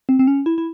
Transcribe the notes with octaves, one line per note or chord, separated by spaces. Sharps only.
C4
C4
C#4
E4
E4